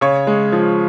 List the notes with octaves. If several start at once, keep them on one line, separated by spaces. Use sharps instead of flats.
C#3 C#5
G#3
F3